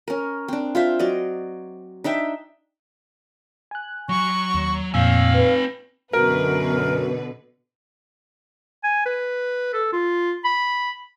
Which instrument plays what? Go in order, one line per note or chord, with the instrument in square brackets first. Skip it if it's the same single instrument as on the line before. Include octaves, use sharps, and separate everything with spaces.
[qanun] C#4 A#4
C4 D4
F4 C5 E5
F#3 D5 D#5
D4 D#4 E5 G5
[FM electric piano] G#5 F#6
[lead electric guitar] F#3 [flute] C#6
[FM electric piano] D#2
[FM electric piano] F2 A#2 E6 [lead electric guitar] C4 G#5 [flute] F5
[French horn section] B4
[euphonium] F#2 [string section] B2 D3 B4 [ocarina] F#4 [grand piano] A#4
[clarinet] G#5
B4
A4
F4
B5